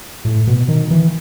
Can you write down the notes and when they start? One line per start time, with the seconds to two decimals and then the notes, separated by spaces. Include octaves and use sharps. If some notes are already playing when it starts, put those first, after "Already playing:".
0.25 A2
0.47 B2
0.68 D#3
0.91 E3